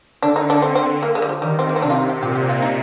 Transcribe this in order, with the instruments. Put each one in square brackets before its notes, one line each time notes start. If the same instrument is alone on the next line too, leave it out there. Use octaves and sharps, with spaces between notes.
[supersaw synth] D3 [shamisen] D4
[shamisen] D#4
D4
C4
C4
A#3
G#3
G3
F3
[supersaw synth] D#3 [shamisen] G3
[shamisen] C4
A#3
C4
[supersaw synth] C3 [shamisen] D4
[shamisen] F4
D#4
G4
[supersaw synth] A#2 [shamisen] G4
[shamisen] G4
F4
D#4